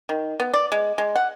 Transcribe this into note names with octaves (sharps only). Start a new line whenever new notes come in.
D#3
B3
D5
G#3
G#3
F#5